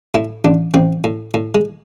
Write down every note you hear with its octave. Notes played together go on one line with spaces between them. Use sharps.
A2 E4
A1 D4
A1 C4
A2
A2
G#3